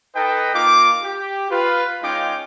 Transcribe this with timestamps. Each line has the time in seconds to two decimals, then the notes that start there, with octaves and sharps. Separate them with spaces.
0.15 D#4 A4 B4 D#5 G5
0.54 A#3 D#4 F4 D6
1.03 G4
1.50 F4 B4
2.02 G#3 C#4 D#4 F4 G5 D6